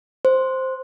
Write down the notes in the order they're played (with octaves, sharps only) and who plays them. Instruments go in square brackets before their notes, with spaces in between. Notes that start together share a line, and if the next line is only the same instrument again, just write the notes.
[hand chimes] C5